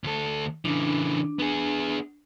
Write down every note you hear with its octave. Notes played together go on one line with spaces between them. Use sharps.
D2 A4
C#3 E3 D4
B3 G#4